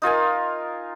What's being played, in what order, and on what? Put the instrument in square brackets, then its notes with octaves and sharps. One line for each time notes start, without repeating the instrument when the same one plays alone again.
[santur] D#4 F4 A#4 G#5